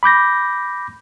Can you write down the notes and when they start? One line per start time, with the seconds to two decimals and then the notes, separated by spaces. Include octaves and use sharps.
0.03 B5 D6 G6 A#6